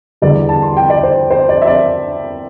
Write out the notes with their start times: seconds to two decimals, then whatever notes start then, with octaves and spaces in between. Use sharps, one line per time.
0.22 E2 D3 G3 D5
0.49 A5
0.62 C6
0.77 G5
0.90 D5
1.03 C5
1.31 C5
1.49 D5
1.62 E5
1.67 D5